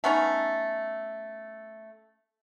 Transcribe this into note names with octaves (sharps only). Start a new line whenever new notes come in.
A3 B3 C#4 D#4